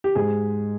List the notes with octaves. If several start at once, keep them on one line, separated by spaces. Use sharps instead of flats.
G4
G#2 G#4